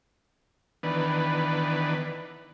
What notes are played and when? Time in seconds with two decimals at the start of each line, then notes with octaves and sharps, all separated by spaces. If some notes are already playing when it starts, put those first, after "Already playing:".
0.83 D#3 E3 B3 D4 B4